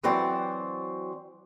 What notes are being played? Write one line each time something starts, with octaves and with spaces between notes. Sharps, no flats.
E3 F#3 C4 C5 D5